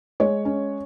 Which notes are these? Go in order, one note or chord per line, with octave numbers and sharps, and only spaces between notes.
G#3 C#5
C#4